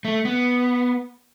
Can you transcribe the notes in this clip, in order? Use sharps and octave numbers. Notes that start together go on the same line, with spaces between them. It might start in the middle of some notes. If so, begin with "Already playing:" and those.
A3
B3